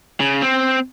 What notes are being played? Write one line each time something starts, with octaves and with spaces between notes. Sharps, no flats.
C#3
C4